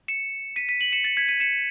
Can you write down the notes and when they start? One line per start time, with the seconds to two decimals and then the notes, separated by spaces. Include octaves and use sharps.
0.08 C#7 E7
0.56 B6 D#7
0.69 B6 D#7
0.80 D#7 F#7
0.92 C#7 E7
1.04 A6 C#7
1.17 G#6 B6
1.28 B6 D#7
1.40 C#7 E7